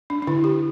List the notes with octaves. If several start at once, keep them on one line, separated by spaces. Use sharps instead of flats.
D4
D4
D3 E4
G4